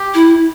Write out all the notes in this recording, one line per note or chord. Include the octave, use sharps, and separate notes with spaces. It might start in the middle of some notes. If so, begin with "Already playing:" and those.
Already playing: G4
E4